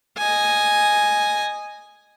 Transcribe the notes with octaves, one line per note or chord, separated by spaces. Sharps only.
D#5 G#5